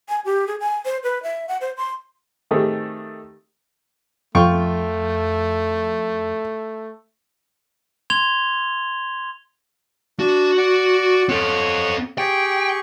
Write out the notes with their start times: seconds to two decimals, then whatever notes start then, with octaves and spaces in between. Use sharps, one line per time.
0.09 G#5
0.25 G4
0.47 G#4
0.60 G#5
0.85 C5
1.04 B4
1.23 E5
1.48 F#5
1.61 C5
1.77 C6
2.51 D#3 A3 C4 G4 G#4
4.35 F2 A3 F4 G5 C#6
8.10 C6 G#6 F7 G7
10.19 D4 F#4 A5
10.58 D5 F#5
11.29 C4 A4 C#5 F#5
12.18 G4 G#4 G5 C#6